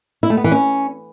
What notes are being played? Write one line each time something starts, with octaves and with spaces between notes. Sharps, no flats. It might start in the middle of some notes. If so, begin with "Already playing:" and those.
E4
A3
B3
E3
C#4